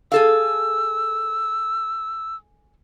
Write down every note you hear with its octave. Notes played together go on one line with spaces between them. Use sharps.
G#4 A4 F5 E6